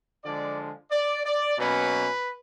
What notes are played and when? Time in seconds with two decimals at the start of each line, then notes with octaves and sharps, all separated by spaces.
0.23 D3 F3 G#3 D5
0.91 D5
1.25 D5
1.58 B2 F#3 A#3 C#4 B4